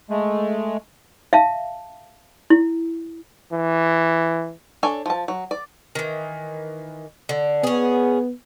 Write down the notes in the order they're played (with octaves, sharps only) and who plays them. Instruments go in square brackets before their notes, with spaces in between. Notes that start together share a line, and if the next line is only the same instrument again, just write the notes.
[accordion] G#3 A3
[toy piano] E5 F5 A5
E4
[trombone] E3
[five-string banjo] D4 A4 C#5 G#5
F3 A5
F#3
D5
[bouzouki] D#3 E3
D3
[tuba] B3 [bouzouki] C#4 G#4